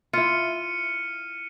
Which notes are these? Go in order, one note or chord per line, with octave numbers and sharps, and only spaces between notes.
E4 F4 F6 C#7 D#7